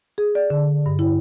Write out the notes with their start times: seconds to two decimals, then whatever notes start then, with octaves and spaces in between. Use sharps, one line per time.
0.18 G#4
0.35 D5
0.50 D3
0.86 G2
0.99 E4